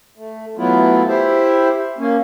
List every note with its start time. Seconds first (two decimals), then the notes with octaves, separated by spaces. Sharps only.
0.17 A3
0.57 E3 F#3 A3 B3 E4 F4
1.08 E4 G4 C5 E5
1.98 A#3 C#4